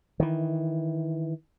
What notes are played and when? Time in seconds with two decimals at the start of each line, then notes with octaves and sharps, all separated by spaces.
0.20 D#3 E3